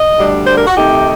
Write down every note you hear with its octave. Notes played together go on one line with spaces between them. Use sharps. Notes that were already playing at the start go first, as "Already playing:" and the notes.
Already playing: D#5
D2 D3 G3 D4
C5
A#4
F#4
C3 D#3 A3 D#4 G4